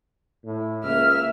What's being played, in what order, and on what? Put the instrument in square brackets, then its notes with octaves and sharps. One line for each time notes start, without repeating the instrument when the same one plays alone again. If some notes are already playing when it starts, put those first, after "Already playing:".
[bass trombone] A2
[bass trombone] C#2 [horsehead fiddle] A#3 E5 [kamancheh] F6